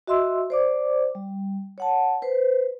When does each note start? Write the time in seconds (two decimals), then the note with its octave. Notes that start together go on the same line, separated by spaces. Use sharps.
0.07 F#4 D#5 E5 C6 E6
0.50 C5 D5 D6
1.15 G3
1.78 C#5 F#5 A5
2.22 B4 C5